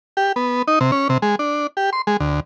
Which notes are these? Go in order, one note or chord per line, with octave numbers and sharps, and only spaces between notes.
G4
B3
D#4
C3
C#4
C3
G#3
D4
G4
C6
G#3
D2